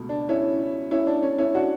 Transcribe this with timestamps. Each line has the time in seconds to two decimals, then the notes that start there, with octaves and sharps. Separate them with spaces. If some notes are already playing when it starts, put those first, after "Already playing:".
Already playing: C#2 B2 A3
0.09 D4
0.29 C#4 E4
0.91 C#4 E4
1.07 D4
1.23 C#4
1.38 C#4 E4
1.54 D4 F#4